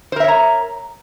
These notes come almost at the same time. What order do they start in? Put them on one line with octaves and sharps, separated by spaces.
C5 A#4 E5 C#5 A#5